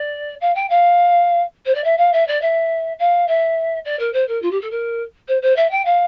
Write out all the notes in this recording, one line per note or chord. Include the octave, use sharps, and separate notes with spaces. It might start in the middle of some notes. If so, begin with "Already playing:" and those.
Already playing: D5
F5
G5
F5
C5
D5
E5
F5
E5
D5
E5
F5
E5
D5
A#4
C5
A#4
F4
G4
A4
A#4
C5
C5
E5
G5
F5